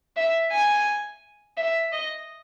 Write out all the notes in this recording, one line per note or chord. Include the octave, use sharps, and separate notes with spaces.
E5
G#5
E5
D#5